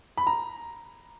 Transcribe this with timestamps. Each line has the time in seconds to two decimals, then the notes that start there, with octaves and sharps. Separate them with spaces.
0.18 B5
0.27 A#5